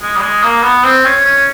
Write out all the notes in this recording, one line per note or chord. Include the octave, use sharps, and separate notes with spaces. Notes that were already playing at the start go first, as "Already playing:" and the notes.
G#3
G3
G#3
A#3
B3
C4
C#4
C#4